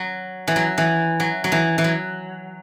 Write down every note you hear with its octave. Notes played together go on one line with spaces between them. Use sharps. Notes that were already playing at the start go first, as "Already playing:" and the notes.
Already playing: F#3
E3
F#3
E3
F#3
F#3
E3
E3
F#3